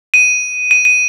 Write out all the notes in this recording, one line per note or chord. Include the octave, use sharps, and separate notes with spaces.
D#7
D#7
D#7